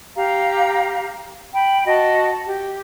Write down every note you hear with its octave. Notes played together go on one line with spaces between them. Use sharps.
G4 F5 A#5
G5 B5
F#4 D#5 A5
G4